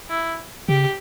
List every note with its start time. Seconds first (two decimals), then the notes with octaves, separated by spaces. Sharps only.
0.10 E4
0.68 C#3 G4